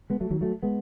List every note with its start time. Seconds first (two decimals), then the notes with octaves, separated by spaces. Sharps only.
0.10 G#3 B3
0.20 F#3 A3
0.30 D#3 F#3
0.41 F#3 A3
0.63 G#3 B3